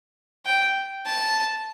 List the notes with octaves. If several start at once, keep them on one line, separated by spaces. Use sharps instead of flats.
G5
A5